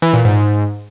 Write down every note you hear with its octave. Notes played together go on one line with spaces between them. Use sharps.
E3
A#2
G#2